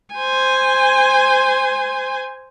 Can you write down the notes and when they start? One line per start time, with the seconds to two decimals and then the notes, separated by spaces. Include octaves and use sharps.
0.15 C5 G#5